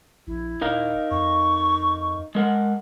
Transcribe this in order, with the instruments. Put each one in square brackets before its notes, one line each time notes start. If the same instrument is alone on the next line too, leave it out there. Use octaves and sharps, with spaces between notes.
[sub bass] A#1 [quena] E4
[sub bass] D#1 [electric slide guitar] D#4 A#4 F5
[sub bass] F2 [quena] C#6
[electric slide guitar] G#3 A#4 F#5